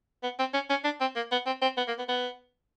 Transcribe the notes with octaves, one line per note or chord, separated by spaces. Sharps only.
B3
C4
C#4
C#4
D4
C4
A#3
B3
C4
C4
B3
A#3
B3
B3